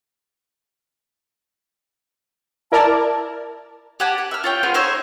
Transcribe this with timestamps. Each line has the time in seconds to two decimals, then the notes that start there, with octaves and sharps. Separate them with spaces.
2.72 E4 A#4 D5 A5
4.00 G4 F#5 G#5 A5
4.18 F#5
4.31 E5 F6
4.44 F4 C#5 G5
4.63 B3 C4 F4 G#4
4.74 D#4 C5 C#5 E5